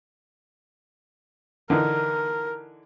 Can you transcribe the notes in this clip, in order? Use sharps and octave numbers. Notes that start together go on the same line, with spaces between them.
D3 E3 D#4 A#4